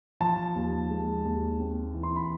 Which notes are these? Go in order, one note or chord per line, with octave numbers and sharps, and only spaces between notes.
F3 A5
D#2
G#3
D#2
C4
E3
C6
B5